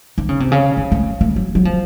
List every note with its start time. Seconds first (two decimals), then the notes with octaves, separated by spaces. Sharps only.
0.18 D#3
0.29 C#3
0.40 C3
0.52 C#3
0.77 F3
0.92 A3
1.21 A3
1.36 F#3
1.55 F#3
1.65 F3